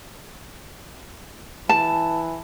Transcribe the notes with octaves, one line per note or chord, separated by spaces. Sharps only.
E3 A5